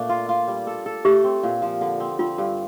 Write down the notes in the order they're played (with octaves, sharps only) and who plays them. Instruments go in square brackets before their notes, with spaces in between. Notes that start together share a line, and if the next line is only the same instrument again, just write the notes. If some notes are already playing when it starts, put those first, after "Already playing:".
Already playing: [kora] A#2 A3 D4
F4
F4
G3
A4
A4
[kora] A3 [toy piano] G4
[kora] C4
A#2
F3
D3
C4
[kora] C4 [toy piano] F4
[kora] G2